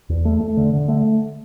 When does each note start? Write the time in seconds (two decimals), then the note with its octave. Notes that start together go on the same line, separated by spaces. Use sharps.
0.09 E2
0.25 A3
0.40 A3
0.57 D3
0.73 D3
0.88 A3